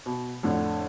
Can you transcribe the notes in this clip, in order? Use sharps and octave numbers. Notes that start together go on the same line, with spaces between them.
B2
F2 A2 D3